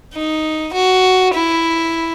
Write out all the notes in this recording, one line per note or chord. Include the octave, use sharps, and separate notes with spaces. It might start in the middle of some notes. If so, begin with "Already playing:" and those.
D#4
F#4
E4